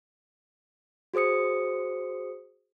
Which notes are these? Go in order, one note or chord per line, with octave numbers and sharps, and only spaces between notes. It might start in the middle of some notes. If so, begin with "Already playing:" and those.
F#4 G#4 C5 D#6 C#7